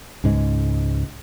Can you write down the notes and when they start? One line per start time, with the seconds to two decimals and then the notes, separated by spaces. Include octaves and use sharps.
0.24 C#2 G#2 G#3